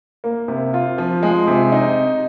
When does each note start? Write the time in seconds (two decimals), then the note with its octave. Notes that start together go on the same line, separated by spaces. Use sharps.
0.24 A#3
0.48 C3
0.74 F4
0.98 F3
1.23 G#3
1.47 C3
1.72 D#4